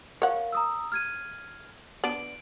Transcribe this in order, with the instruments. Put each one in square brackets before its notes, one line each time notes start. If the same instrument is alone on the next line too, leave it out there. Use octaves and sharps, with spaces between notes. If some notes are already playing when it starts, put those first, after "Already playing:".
[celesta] A#4 F5 [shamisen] C#5 F#5
[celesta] A#5 D#6 E6
F6 G#6 D#7
[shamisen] B3 D4 [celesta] D7 F#7